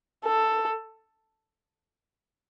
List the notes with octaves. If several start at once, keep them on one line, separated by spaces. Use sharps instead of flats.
A4